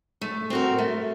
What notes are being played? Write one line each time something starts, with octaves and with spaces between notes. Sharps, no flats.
A3
C4 F#4 A#4
A3